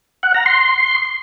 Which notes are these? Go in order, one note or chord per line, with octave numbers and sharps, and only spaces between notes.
F#5
A#5
C6